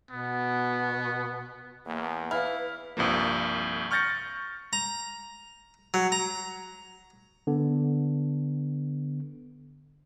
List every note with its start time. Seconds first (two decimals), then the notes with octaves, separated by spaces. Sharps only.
0.10 B2 B3
1.86 E2 A#3
2.31 E4 B4 F5 F6
2.97 C2 G2 F3 A#3
3.91 C#6 F6 G6 A6 A#6 C#7
4.73 A#5
5.94 F#3
6.12 A#5
7.47 D3 B3